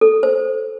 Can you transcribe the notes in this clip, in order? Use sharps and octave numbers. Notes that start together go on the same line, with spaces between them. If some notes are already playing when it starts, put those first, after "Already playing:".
A4
C5